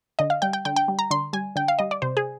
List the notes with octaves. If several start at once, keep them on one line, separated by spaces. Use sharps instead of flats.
D3 D#5
F5
G3 G5
G5
D3 G5
G5
G3
A#5
D3 C6
G3 G#5
D3 G5
F5
G3 D#5
D5
C3 C5
G#4